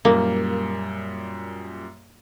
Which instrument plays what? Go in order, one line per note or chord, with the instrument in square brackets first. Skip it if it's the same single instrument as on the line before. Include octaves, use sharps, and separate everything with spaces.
[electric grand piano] F#2 A#2 G3 [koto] A#3